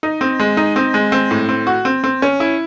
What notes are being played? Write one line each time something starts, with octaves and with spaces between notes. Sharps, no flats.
D#4
C4
G#3
D#4
C4
G#3
C4
A2
C4
F#4
C4
C4
C#4
E4